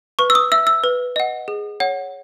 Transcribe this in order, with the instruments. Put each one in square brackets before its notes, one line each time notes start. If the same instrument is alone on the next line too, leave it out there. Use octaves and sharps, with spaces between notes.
[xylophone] B4 C#6
E6
D#6
E5 E6
E6
B4
D#5 F#5
G#4
C#5 F#5